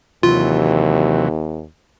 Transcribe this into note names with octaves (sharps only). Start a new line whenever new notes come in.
D#2 C3 E3 F#3 F4